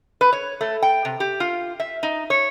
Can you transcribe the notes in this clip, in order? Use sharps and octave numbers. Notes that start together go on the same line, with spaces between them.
B4
C#5
A3
G5
C3
G4
F4
E5
D#4
C#5